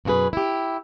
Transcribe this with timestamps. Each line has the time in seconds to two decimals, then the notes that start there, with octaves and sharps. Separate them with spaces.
0.05 F#2 B2 F#4 G#4 B4
0.33 E4 G4